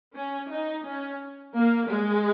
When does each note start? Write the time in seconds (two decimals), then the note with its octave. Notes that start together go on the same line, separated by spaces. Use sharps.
0.14 C#4
0.50 D#4
0.84 C#4
1.55 A#3
1.89 G#3